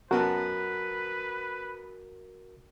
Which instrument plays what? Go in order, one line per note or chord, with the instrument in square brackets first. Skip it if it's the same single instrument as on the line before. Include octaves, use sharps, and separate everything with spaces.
[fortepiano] F#2 B3 A5 [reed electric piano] F#4 A#4 [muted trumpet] B4